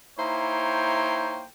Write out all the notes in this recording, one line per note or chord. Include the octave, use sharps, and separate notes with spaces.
A#3 D#4 E4 C5 C#5 G5